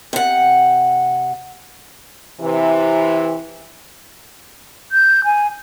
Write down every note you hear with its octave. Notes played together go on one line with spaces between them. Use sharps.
C3 F#5
C3 E3
G6
G#5